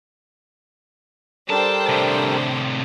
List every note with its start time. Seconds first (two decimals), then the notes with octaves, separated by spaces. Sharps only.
1.50 G3 D4 A4 A#4 C5 G5 A5
1.89 A2 C3